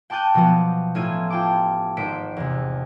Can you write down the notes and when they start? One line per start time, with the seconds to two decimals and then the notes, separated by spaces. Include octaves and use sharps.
0.10 G5 A5 D6 F#6 G6 D#7
0.34 B2 F3 F#3 B3
0.95 A1 A3 E4 F4 G#6 D#7
1.30 F4 G5 A5 D6
1.97 G#1 C5 B6 D7
2.37 E2 C3